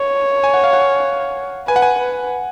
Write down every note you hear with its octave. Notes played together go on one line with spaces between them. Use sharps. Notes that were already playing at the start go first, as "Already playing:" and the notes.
Already playing: C#5
G#5
F#5
F5
F#5
B4 G#5
F#5
G#5
B4